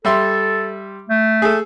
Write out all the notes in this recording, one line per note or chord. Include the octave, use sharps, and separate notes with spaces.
G3 A4 E5 C6
A3
G#4 A4